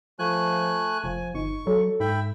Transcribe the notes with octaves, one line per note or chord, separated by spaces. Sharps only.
F3 A3 G#5 F#6
F1 F3 G#5
G1 D#4 C#6
F#3 A4
G#2 E5 G5 B5